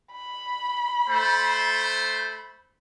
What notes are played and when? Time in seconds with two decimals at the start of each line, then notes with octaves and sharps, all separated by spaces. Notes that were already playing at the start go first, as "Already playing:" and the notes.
0.13 B5
1.09 A3 C5